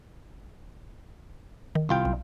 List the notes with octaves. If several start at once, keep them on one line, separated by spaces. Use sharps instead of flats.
D#3
C2 F4 G5
B1